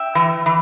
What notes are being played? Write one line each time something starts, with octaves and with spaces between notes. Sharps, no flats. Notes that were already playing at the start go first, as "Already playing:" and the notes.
Already playing: E5 G5
E3
E3